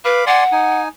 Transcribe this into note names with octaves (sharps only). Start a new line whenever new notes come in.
B4 F5 B5 D6
D5 F#5 G#5 C6
D#4 G#5